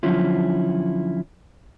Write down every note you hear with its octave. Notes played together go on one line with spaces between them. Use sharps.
D3 F3 F#3 C#4 E4 F4